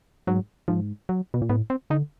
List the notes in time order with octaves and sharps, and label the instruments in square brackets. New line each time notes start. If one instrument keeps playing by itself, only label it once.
[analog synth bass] G#2 [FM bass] F#3
[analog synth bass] G#2 [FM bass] F3
[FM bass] F#3
[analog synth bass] B2
A#2
[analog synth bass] A2 [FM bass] B3
[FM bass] C4
[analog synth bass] D3 [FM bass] D#4